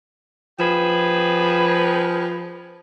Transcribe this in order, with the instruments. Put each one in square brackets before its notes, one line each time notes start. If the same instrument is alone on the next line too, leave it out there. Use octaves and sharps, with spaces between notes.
[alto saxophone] F3 [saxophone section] G4 G#4 B4